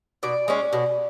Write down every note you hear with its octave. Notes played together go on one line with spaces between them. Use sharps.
B2 D5
G#3 C#4
B2